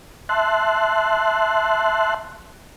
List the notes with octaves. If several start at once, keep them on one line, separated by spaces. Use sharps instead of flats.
E5 A5 C6 F#6